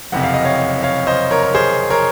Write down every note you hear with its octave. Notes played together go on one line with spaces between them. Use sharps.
F#1 F2 C3 F#5
F5
D#5
C#5 F5
C#5 F5
C5 D#5
A#4 C#5
A#4
G#4 C5
A#4 C#5